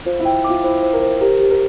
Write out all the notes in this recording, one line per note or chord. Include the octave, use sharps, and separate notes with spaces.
F4 C5
E4
G5
F4 D6
E4 C5
C5
A#4
C5
G4 A#4
G4
A#4